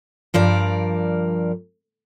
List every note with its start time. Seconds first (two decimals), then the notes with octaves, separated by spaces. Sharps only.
0.34 G2 F3 A#4 D5